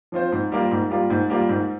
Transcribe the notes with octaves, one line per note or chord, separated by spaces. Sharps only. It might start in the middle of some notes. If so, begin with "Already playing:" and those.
F3 C4 F4 C5
G#2
G3 A#3 F4
G#2
G3 A#3 F4
G#2
G3 A#3 F4
G#2